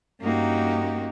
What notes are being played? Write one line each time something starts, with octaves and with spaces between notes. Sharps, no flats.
G2 A#3 C#4 D#4 F#4 G4